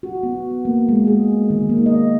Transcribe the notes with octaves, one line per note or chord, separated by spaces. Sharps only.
F#4
B3
A#3
G#3
G#4
D#3
A#3
D#5